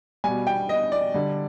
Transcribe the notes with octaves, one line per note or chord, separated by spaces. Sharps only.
B2 G3 G#5
G5
D#5
D5
D3 G3